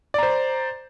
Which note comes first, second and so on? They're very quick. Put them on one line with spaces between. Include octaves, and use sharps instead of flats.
D5 A#5 C5